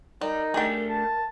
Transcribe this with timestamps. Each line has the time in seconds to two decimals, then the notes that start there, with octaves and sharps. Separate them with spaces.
0.21 G3 D#4 A#4
0.54 A3 D4 G4 G#4 G5
0.89 A5